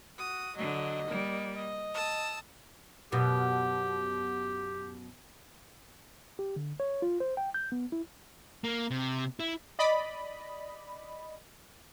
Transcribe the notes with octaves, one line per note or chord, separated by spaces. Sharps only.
F#4 D#6
D3 F#3 D#5
G3 A#3
D#5
A5 D#6 E6
F#2 B2 G4
G4
D3
C#5
F4
C5
G5
G6
B3
E4
A#3
C3
E4
D5 D#5 B5